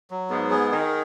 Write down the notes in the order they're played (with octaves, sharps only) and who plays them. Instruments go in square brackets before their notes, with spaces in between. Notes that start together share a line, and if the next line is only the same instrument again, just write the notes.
[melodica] F#3
[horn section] G#2 [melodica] B3
[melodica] G#4
[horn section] D#3 [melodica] G#4